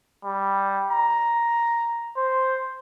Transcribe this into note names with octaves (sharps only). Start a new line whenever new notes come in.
G3
A#5
C5